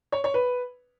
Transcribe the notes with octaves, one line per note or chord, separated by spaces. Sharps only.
C#5
C#5
B4